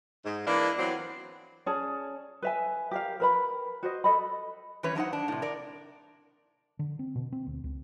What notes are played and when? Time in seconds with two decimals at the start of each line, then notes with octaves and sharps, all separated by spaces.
0.25 G#2
0.46 E3 A#3 D4
0.78 E3 F#3 B3 C4
1.66 C#4 G#4 D5 A5
2.42 B4 E5 G#5
2.91 G4 A#4 F5
3.20 A#4 B4 B5
3.83 F#4 C5 D#5
4.04 A4 D#5 B5
4.83 E3 G3 C#4 B4 C#5
4.95 F#3 D4 D#4 C5 F#5
5.13 D4
5.28 A2 C3
5.42 A#4 D5
6.79 D3
6.99 C4
7.16 B2
7.32 C4
7.47 D2
7.64 C#2